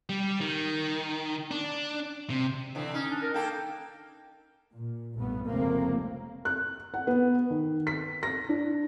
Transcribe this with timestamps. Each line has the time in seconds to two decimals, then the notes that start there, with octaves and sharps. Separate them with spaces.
0.09 G3
0.41 D#3
1.51 D4
2.30 C3
2.75 D3 E3 C4
2.94 C#4 D#4
3.11 D4
3.22 A#4
3.34 A#3 A4 G5
4.75 A#2
5.16 B1 G2 A3 B3
5.47 F1 C#2 C3 A3 A#3 C4
6.45 F#6
6.94 F#5
7.07 B3
7.50 D#3
7.87 B6
8.23 A#6
8.49 D4